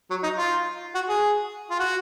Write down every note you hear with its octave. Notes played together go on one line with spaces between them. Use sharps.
F#3
D#4
F4
F#4
G#4
F4
F#4